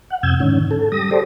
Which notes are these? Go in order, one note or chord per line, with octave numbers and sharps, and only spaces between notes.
F#5
F2 C3 E6 G6 G#6
G#2 D3 D#3 C#4
A4
G3 D#6 A#6
G4 A4 C5 D5